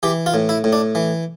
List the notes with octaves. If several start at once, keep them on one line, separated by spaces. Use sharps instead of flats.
E3 G4
F4
A2
E4
A2
D4
E3